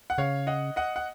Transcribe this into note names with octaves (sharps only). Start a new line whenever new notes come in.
F#5
C#3 C#5 F5
D#5 F#5
D#5 F#5
F#5